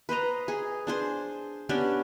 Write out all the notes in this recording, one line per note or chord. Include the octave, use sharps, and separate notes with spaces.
B4 C5 D#5 A#5
G#4
D4 G#4 C5
B3 C#4 D4 G4